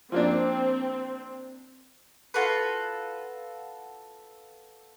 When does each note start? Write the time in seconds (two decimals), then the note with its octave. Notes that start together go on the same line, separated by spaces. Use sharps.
0.12 F3 A#3 C4 D4
2.34 F4 F#4 A4 B4